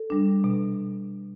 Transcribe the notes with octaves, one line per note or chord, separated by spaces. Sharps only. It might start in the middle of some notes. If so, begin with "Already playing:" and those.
Already playing: A4
G3 D4
B2